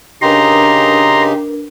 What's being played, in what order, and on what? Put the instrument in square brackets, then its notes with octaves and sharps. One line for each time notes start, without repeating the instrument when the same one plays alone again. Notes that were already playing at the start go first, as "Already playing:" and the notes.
[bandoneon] C#3 D#4 G4 [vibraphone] D4 A#4 B4 [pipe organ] A#5 C6